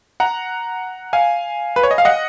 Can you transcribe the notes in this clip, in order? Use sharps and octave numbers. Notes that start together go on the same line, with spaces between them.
F#5 A#5
F5 G#5
B4
C#5
D#5
F5
D#5 F#5